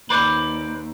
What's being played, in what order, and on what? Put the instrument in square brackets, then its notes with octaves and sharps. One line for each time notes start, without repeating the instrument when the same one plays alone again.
[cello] D#2 [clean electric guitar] B4 C5 D5